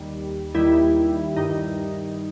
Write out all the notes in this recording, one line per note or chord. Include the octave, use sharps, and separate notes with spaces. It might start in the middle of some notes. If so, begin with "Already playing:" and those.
Already playing: D#2 D#3 G3
D#2 D#3 G3 E4
G2 D#3 G3 D#4